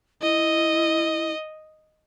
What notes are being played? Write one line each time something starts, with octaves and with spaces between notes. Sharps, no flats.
E4 D#5